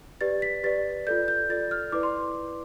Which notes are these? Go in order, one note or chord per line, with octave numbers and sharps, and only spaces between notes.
G4 B4 D5 A6
B6
G4 B4 D5 A6
F4 A4 D5 G6
G6
F4 A4 D5 A6
F6
E4 B4 D5 D6
C6